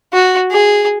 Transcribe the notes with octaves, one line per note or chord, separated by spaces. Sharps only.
F#4
G#4